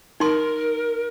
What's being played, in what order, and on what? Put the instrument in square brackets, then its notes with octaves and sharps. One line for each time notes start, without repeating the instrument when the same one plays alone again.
[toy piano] D#4 C6 [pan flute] A#4